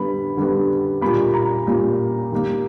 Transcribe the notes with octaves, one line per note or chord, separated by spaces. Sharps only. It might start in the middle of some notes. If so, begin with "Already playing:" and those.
Already playing: D3 G3 B3 B5
D3 G3 B3
A#2 G3 A#3 B5
A#5
A#2 G3 A#3
D#3 G3 A#3